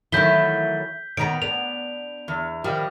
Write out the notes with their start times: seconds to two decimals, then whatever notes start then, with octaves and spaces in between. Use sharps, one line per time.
0.12 D#3 E3 F#3 A3 E4 G6 B6 G7
1.17 D#3 B3 C#5 A#5 D7
1.42 B3 D4 F7
2.28 E2
2.64 D#3 F3 G3